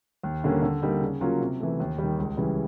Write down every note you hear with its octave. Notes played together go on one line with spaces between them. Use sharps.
D#2
D3 G3 A#3 C#4
D3
G3 A#3 D#4
C#3
F#3 A#3 C#4 F4
C3
E3 A3
D#2
D#3 G3
C#2
C#3 E3 G3